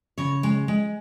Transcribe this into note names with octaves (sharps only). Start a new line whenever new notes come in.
C#3 C#5
G#3
G#3